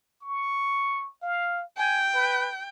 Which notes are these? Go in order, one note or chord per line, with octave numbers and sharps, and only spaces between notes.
C#6
F5
G5 G#5
B4